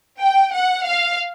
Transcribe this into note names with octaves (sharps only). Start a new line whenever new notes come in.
G5
F#5
F5